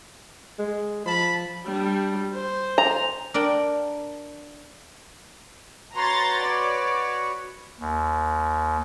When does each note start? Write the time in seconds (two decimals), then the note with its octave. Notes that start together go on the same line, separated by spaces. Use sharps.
0.59 G#3
1.06 F3 A5 B5
1.65 G3 D4
2.34 C5
2.78 A#5
3.34 D4 A#4 D5 G5
5.96 F#4 B4 C#5 A#5 C6 A6
6.44 D5
7.80 D#2